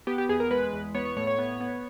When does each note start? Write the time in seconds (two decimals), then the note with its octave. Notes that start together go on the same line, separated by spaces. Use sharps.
0.07 B3 G4
0.18 G4
0.29 E2 G#4
0.40 A#4
0.51 G#3 B4
0.73 E2
0.95 B3 C#5
1.05 C#5
1.16 A2 C#5
1.27 C#5
1.38 B3
1.61 B3